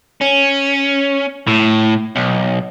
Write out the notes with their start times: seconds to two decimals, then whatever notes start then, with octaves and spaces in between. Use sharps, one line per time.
0.22 C#4
1.47 A2
2.16 B1